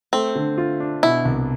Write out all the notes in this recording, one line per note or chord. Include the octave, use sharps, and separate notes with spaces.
A3 C4
D3
F4
D4
B2 E4
C2